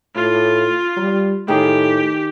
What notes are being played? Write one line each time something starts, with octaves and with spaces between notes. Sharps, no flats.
A2 F4
G3
A2 D#3 G4 G#4